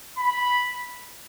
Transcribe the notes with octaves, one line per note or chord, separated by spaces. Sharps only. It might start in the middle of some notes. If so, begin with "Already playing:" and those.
B5